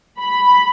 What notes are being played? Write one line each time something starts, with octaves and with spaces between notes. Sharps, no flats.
B5